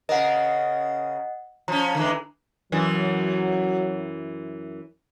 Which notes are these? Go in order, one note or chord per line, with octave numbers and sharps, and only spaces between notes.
C#3 A#4 D#5 F#5
F3 C#4 A#5
D3 E3 G#3
F#2 E3 F#3